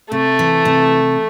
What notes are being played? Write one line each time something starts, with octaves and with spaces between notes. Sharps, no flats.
C3 A3
E3
C3